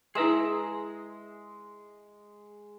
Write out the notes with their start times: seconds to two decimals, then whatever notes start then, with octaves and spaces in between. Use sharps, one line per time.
0.15 G#3 E4 G#4 B4 E5 A#5 E6